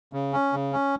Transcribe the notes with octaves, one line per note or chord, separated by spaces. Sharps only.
C#3
C#4
C#3
C#4